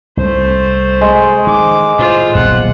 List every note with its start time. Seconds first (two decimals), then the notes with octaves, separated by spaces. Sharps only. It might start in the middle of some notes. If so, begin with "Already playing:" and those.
0.17 C2 A3 C5
1.01 G#3
1.47 D#3 D6
1.99 A2 F4 C5
2.35 D#1 B1 A2 F4 F#5